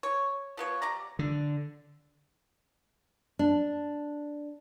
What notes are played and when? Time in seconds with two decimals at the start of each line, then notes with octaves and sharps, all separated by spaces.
0.03 C#5
0.57 F3 B3 C#5
0.82 G3 D5 A#5
1.19 D3
3.39 D4